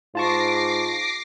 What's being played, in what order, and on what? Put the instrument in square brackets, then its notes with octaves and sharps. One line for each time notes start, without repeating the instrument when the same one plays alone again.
[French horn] G#2 [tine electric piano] F4 A5 C#6 [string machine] D6 A#6 C7